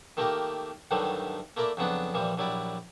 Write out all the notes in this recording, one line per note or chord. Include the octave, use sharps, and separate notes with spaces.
D#3 A3 A#3 G4 A#4
D2 G2 D#3 F#3 G3 A3
A3 A#3 E4 A#4 D5
F2 C#3 F#3 B3 D4
A#2 E3 F3 G3
A#1 F#3 G3 E4 D5